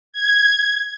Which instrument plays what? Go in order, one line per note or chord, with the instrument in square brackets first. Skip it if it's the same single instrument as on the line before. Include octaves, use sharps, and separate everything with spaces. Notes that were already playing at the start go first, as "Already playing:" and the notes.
[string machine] G#6